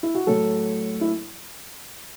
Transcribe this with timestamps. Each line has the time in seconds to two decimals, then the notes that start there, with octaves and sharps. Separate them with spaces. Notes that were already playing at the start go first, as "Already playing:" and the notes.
0.03 E4
0.15 F#4
0.27 A2 F#3 A4
1.01 E4